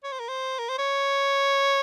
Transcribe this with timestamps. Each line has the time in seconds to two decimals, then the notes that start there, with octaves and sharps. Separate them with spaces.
0.04 C#5
0.12 C5
0.20 A#4
0.29 C5
0.59 A#4
0.69 C5
0.79 C#5